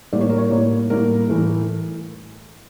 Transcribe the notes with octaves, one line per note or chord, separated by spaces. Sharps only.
A2 G3 A#3 D5
C#5
A#4
C#5
A2 G3 A#3
A2 G3 A#3 A#4
A2 E3 A3